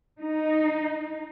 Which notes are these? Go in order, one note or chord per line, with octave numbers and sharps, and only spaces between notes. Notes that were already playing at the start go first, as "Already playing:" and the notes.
D#4